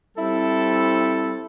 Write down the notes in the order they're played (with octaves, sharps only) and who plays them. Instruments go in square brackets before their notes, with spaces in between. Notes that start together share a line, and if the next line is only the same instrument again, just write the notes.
[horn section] G3 C4 E4 A4